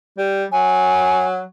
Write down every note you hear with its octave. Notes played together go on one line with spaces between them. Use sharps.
G3
F#3 G#5